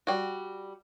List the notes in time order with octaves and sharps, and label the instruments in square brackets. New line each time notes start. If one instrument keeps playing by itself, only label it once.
[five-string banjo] G3 F#4